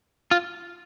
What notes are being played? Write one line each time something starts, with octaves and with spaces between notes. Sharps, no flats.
F4